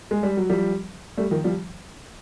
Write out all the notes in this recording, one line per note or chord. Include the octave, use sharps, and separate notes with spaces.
G#3
G3
F#3
F3 G3
G3 A3
D#3 F3
F3 G3